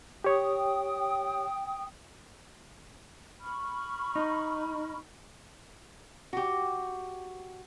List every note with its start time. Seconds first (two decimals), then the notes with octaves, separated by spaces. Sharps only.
0.24 G4 C#5 G5 D#6
3.41 B5 C#6 F6
4.15 D#4
6.33 F#4 G4